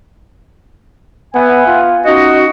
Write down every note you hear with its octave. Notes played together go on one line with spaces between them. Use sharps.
B3 E5 F#5 G#5
F4
C#4 D#4 F#4 D#5